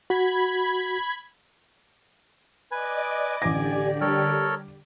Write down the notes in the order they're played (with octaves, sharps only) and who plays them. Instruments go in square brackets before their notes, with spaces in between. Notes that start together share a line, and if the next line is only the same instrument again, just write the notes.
[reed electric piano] F#4 [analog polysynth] B5 G#6
[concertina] B4 G#5 [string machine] D5 D#5 D6
[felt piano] A1 D6 A#6 [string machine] D3 G4 D5 [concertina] G#5
[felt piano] G3 [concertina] A4 A#4 C#5